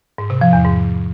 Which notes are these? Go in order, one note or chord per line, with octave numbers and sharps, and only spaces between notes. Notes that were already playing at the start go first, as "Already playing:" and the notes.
G#2
C3
F3
E2
G#2